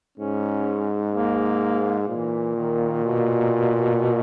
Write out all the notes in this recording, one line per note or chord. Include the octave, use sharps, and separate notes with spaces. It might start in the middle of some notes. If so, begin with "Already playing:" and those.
G#2 C#4
A#3
A#2 E3
D#3
B2